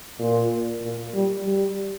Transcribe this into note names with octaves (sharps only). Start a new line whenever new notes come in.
A#2
A#2
G3
G3